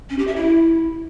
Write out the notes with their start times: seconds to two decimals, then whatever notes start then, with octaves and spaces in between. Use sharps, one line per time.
0.10 C#4
0.19 G4
0.27 E5
0.36 E4